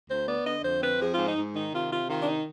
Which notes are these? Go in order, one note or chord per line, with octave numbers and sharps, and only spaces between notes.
D2 C5
B3 D5
D3 D#5
F2 C5
C4 B4
F3 G#4
G#2 F4
D#4
G#2
D#3 D#4
C3 F4
C3 F4
D#3 F4
D4
D#4